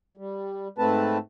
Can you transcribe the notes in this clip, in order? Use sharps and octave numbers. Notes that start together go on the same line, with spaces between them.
G3
G#2 A3 C4 B4 A5